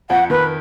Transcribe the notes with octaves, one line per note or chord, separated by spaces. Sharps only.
F2 F3 F#5
D#3 B4